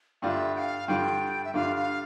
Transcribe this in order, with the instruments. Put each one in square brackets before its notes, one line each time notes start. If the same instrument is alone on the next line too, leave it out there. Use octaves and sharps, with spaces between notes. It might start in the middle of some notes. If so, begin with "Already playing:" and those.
[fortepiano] G2 D3 G3 D4 F4 [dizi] E5 F5
[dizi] G5
F5
[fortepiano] G2 D3 G3 D4 F4 [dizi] G5
[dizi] E5
[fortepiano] G2 D3 G3 D4 F4 [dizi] F5
[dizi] F5